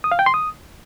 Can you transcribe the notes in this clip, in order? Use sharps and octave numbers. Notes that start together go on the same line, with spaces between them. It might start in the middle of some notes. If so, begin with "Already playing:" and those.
D#6
F5
G5
C6
D#6